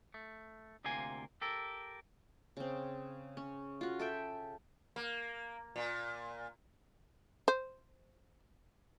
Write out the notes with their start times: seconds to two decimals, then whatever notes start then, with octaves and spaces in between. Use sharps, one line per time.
0.14 A3
0.84 D2 C3 A#3 F4 G#5
1.41 G4 A4 A#4
2.57 C#3 C4
3.37 C#4
3.81 F4 F#4
3.99 A4 E5 G5
4.96 A#3
5.76 A#2
7.48 C5